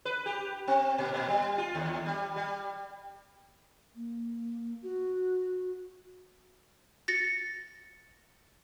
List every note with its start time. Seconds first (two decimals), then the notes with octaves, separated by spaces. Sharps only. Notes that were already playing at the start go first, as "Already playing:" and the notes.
0.05 B4
0.26 G4
0.68 C4
0.98 A#2
1.14 A#2
1.28 G3
1.58 F4
1.75 D#2
2.06 G3
2.36 G3
3.95 A#3
4.82 F#4
7.08 A6 A#6 C#7